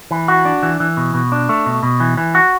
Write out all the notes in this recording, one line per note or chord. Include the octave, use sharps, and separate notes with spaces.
E3
F#4
D4
E3
E3
B2
B2
D4
A3
B2
B2
E3
E3
F#4